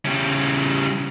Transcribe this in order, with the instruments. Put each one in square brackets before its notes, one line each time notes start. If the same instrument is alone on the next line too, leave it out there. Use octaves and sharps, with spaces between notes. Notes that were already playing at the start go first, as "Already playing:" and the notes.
[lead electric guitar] C#3 G3